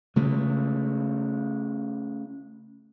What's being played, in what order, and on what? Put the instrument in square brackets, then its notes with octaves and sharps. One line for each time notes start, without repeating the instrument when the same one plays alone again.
[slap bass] C#3 G#3 A3